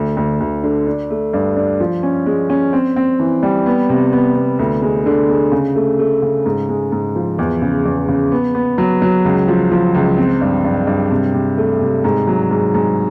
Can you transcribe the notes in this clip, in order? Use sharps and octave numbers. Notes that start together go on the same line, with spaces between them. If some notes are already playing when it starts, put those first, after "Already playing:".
Already playing: D2
D2
D2
D3
D4
A3
G2
D4
F3
C#4
G#3
C#4
C4
C4
E3
G3
B3
C3
B3
B3
D2
G#3
D3
G#3
C#3
A3
A3
C#3
G#2
G#3
G#2
F3
E2
C#3
E2
C#3
B3
B3
F#3
F#3
C#2
F3
F3
C#2
C4
G2
G2
G2
C3
C3
A3
C3
G#2
F#3
G#2
G#2